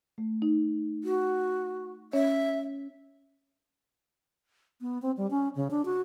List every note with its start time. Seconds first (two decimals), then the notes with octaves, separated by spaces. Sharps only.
0.18 A3
0.42 D#4
1.04 F#4
2.13 C#4 C#5 E5
4.81 B3
5.02 C4
5.17 G3
5.30 C#4
5.55 C#3
5.71 D4
5.85 F#4